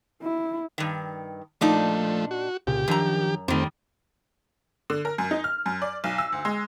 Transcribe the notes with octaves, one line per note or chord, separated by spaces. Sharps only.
E4
G2 D#3
A#2 F3 A3 D4 D#4
F#4
C2 A#2 C#3 G4
F#2 D#3 F3 D4 A#5
F2 D#3 G3 A3 C4
D3
A#4
F#2
D#4
F6
F#2
D5
B1
E6
D2
G#3